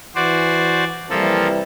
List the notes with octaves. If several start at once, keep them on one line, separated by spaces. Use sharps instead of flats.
E3 F#4 C5 D5
C3 E3 F3 G3 A#3 A4